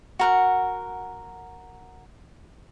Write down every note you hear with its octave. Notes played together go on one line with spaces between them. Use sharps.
F#4 A#4 F#5